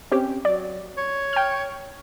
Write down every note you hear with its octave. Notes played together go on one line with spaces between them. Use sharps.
C4 C#4 G4
F#3 D5
C#5
G5 F6